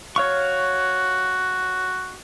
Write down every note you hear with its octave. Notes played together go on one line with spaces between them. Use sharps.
F#4 C#5 F5 C#6